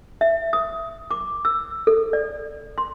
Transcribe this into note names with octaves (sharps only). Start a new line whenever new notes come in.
E5
D#6
D6
E6
A4
D5
C6